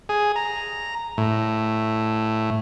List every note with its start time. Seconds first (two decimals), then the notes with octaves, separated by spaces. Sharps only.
0.09 G#4
0.36 A#5
1.18 A2